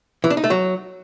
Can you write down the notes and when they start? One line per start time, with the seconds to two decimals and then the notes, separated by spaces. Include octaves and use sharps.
0.24 E3
0.30 D4
0.37 D#4
0.44 A3
0.50 F#3